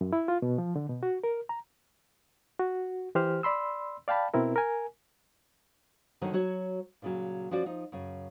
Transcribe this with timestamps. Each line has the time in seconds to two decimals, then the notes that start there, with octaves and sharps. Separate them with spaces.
0.01 F#2
0.13 E4
0.28 F4
0.42 B2
0.58 F3
0.76 D3
0.89 B2
1.03 F#4
1.24 A#4
1.49 A#5
2.59 F#4
3.15 E3 G4 C5 F6
3.43 D5 B5 C6 E6
4.08 D5 F5 G5 A5 B5
4.34 B2 C4 E4 A#4
4.56 A#4 G#5
6.21 D3 D#3 F#3
6.33 F#3 F#4 C#5
7.02 A#2 C#3 F#3
7.51 F3 C#4 F#4 D5
7.66 F3 D#4
7.92 F#2 C#3